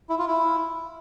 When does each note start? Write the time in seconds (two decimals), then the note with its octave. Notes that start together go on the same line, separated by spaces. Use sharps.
0.09 E4
0.19 F4
0.28 E4